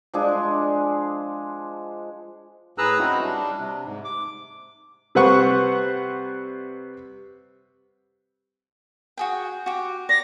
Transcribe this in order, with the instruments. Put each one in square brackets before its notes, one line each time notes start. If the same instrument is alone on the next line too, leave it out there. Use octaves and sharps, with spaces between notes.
[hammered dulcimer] F3 G#3 D4 G#4
[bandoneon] A2 G#4 B4 A#5 E6 F#6
C4 C#4 D#4 E4 F#4
G3 D4
C3
G#2
D6
[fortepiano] C3 G3 B4 C5 F#5 C#6
[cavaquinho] F#4 G#4 G5
F#4 G4
[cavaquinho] D5 [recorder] A#6